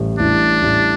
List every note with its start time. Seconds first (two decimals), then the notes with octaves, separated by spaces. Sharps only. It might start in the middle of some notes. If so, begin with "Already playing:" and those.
Already playing: A1 A2 E3 G3
0.19 A1 A2 E3 G3 D4
0.62 A1 A2 E3 G3